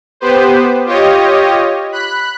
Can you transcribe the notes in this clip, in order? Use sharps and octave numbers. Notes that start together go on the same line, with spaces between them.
B3 G4 B4 C5
F4 G4 C#5 D#5
B5 F#6